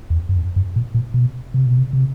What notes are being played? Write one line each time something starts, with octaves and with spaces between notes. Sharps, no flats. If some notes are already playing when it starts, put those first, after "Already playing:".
E2
F#2
F2
F#2
A#2
A#2
B2
C3
B2
C3
C3